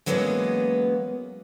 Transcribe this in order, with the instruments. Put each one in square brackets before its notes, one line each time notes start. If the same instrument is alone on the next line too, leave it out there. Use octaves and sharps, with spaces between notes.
[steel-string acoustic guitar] E3 F#3 G#3 A#3 B3 C#4